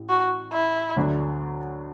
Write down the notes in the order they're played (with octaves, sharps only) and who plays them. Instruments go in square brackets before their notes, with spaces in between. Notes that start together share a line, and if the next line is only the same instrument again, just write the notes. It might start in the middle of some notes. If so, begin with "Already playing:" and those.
Already playing: [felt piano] A1 A2
[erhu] F#4
E4
[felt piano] D2 D3 F#3 D4